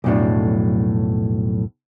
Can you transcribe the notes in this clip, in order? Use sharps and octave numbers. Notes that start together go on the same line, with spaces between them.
B1 F2 A2 F#3 D4